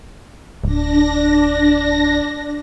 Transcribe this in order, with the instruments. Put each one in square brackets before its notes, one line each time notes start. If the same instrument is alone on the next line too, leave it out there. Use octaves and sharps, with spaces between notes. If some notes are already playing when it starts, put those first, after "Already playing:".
[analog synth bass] D1 [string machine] D4 A#6